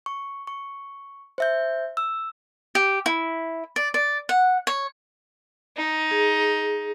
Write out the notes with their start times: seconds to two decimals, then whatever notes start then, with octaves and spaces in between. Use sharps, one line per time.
0.06 C#6
0.47 C#6
1.38 C5 E5 G6
1.97 E6
2.75 G4
3.06 E4
3.76 D5
3.94 D5
4.29 F#5
4.67 C#5
5.77 D#4
6.11 G#4